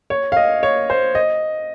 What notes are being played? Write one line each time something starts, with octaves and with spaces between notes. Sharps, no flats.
C#5
F5
D#5
C#5
C5
D#5